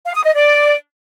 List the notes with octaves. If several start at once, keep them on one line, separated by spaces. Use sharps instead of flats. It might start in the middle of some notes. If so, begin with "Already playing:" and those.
F5
D#6
D#5
D5